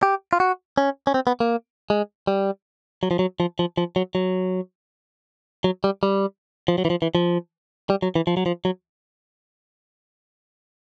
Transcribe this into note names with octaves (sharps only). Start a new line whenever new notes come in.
G4
F4
F#4
C#4
C#4
C4
B3
A#3
G#3
G3
F#3
F3
F#3
F3
F3
F3
F#3
F#3
F#3
G3
G3
F3
F#3
E3
F3
E3
F3
G3
F#3
E3
F3
F#3
F3
F#3